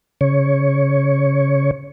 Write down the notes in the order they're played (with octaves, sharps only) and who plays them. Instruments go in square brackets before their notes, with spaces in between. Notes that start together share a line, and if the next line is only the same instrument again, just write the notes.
[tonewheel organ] C#3 C#5